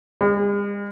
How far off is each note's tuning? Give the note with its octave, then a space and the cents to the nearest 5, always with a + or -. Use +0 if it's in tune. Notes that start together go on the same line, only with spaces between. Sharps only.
G#3 -45